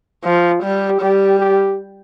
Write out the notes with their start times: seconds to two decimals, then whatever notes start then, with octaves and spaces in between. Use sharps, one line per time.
0.24 F3 F4
0.63 G3 G4
1.01 G3 G4
1.40 G4